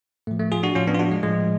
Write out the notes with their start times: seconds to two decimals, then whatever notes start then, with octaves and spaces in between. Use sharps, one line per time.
0.27 A2 F3 A3
0.39 A3
0.52 F4 G#4
0.63 D4 F#4
0.75 A2 F3 C#4 F4
0.87 B3 D4
0.94 F4
0.99 D4 F#4
1.11 G#3
1.23 A2 F3 G#3